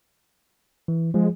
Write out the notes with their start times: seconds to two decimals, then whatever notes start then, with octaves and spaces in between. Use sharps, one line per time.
0.88 E3
1.14 F3 G#3